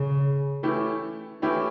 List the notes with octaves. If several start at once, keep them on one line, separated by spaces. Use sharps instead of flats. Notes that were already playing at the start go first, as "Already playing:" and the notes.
Already playing: C#3
E3 A3 C#4 E4 G4
E3 A3 C#4 E4 G4